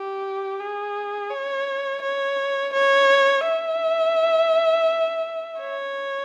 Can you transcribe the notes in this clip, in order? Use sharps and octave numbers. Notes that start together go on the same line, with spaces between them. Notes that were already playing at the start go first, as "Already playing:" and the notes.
Already playing: G4
G#4
C#5
C#5
C#5
E5
C#5